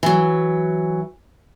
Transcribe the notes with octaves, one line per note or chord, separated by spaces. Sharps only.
E3 F#3